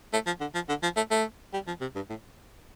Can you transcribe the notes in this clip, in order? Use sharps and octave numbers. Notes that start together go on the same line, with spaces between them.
A3
F3
D3
F3
D3
F3
A3
A3
G3
F3
C3
G2
A2